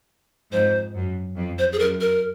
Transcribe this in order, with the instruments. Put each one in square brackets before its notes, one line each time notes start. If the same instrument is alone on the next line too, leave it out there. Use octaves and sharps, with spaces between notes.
[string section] F2 G#2 [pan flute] C5
[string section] F#2
F2
[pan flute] C5
G#4
[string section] F#2 [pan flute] A#4
[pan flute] A#4